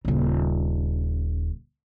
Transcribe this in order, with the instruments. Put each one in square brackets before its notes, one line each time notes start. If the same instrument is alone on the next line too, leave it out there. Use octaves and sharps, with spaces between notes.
[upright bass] D#1 C#3